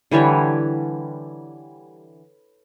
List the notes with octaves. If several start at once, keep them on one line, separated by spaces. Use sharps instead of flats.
D3 E3 G3 C#5